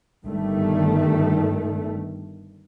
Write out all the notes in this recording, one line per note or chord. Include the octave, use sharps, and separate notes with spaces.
G1 G2 D#3 G3 A3